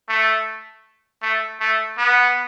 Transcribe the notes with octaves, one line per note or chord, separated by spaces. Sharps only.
A3
A3
A3
B3